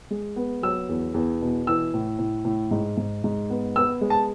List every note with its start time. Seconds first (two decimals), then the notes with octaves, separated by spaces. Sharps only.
0.11 G#3
0.36 B3
0.63 F#3 E6
0.89 E2
1.14 E2
1.42 B2
1.67 E3 E6
1.94 A2
2.19 A2
2.45 A2
2.71 G#2
2.97 G#2
3.24 G#2
3.50 B3
3.76 B3 E6
4.01 G#3
4.10 A5